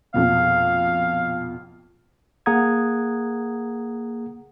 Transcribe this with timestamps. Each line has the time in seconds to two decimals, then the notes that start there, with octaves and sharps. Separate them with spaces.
0.14 A#1 F2 B2 F5
2.46 A#3 G#4 F#5 A#5 D#6 G#6